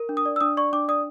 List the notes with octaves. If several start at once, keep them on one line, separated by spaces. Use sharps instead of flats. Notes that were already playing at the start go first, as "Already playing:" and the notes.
Already playing: A#4
D4
D#6
D5
E6
D4 D#6
D5 C#6
D4 D6
D5 D#6